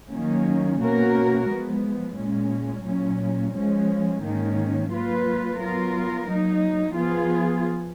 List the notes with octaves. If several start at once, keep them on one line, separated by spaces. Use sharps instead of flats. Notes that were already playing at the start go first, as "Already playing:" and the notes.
D#3 F#3 A#3 C#4
B2 A#3 C#4 F#4 A#4
F3 G#3 B3
A#2 G#3 C#4
A#2 F#3 C#4
F3 G#3 C#4
G#2 D#3 A#3 C#4
F#3 A#3 F4 B4
F#3 B3 F4 A#4
F#3 A#3 D#4
F3 B3 F4 G#4